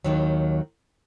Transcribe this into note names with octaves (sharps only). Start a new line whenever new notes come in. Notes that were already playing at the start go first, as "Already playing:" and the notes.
D#2 D#3 F#3